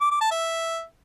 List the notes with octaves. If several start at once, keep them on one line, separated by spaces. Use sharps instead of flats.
D6
D6
A5
E5